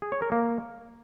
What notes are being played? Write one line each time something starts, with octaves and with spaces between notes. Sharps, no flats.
G#4
C#5
A#4
A#3